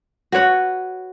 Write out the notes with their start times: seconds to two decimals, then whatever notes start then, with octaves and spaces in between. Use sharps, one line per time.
0.32 F#4 B4 C#5 F#5